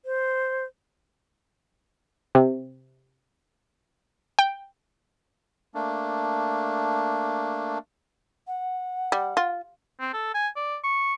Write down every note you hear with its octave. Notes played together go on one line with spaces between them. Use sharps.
C5
C3
G5
A3 A#3 D4
F#5
G3
F4
C4
A4
G#5
D5
C#6